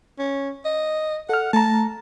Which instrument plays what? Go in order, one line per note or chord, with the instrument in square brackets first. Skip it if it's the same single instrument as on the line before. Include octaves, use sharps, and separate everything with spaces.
[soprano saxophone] C#4
D#5
[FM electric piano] A4 F6 [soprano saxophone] F#5
[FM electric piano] A3 A#5 [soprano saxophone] A5